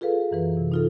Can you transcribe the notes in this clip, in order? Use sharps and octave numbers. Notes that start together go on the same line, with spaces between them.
F4 G#4 A4 B4 F5
F#2 E3 B4
C3
D#4 F4 A4